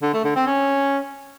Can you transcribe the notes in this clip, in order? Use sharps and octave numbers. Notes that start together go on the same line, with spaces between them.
D3
A3
D3
C4
C#4